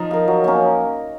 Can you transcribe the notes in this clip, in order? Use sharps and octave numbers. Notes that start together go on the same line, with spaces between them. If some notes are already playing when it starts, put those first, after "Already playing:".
Already playing: F3 D#4
A#4 F5
F#3
A#3 C#4